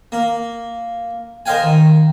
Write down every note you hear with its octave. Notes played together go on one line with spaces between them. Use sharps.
A#3
A#4 C5 D#5 F5 G5 G#5
D#3